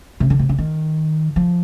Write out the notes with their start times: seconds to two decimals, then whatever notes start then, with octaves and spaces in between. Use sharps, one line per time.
0.20 C3
0.30 D3
0.39 C3
0.49 D3
0.58 D#3
1.36 F3